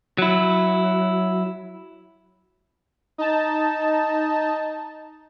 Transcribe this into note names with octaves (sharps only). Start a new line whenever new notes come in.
F#3 E4
D#4 A5